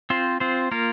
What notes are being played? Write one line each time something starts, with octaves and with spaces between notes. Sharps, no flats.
C4 F4 C5
C4 F4 C5
A#3 F4 A#4